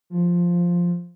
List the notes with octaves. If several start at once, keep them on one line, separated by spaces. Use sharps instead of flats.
F3